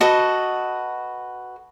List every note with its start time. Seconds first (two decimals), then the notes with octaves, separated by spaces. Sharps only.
0.01 F#4 A4 B4 D#5